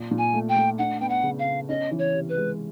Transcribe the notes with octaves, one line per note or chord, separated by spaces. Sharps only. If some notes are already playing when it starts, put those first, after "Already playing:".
Already playing: A#2
A#2
G#5
A3
G5
A3
D4 F#5
B3 G5
F#5
C#3
F5
B3
C#4 D#5
E3
C#5
C3
B4
G#3